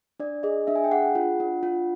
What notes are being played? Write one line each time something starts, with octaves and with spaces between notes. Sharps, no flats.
D4 D5
G#4 D#5
D4 E5
G#5
G5
G#4 F#5
F4
D4
F4